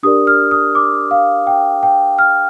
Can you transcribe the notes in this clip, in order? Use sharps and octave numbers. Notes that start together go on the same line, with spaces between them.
D4 G4 A#4 D5 D#6
F6
D#6
D6
F5
G5
G5
F6